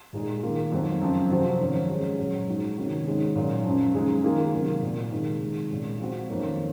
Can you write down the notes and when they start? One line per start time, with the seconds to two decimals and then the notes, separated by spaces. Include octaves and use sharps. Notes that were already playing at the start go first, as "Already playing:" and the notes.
0.13 A#2 G#3 D#4 G#4
0.42 D#3 A#3 F4
0.72 F2 D#3 F#3
1.01 F#2 C#3 F3 C4
1.30 F2 C3 F3 C4 F#4
1.60 G#2 D#3 F#3 C#4
1.89 C#3 G#3 C#4 G#4
2.19 A#2 F#3 C#4
2.48 G#2 F3 G#3 D#4 F#4
2.77 C3 D#3 A#3 C#4 F#4
3.06 G#2 D#3 G#3 C#4 G#4
3.35 A#2 F#3 C#4
3.64 F#2 C#3 F3
3.94 C#3 G#3 D#4 G#4
4.24 D#3 A#3 F4 G#4
4.53 C3 D#3 F#3 A#3
4.82 A#2 F#3 A#3 F4
5.12 C3 D#3 G#3 D#4 G#4
5.41 C3 D#3 G#3
5.70 A#2 G#3 C#4
6.00 F3 C4 F#4
6.29 F2 D#3 A#3 C#4